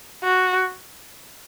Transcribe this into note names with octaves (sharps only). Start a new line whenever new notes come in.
F#4